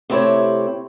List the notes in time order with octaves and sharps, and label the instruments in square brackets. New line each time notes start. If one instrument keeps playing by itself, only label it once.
[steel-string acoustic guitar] C3 A3 C4 E4 G4 C#5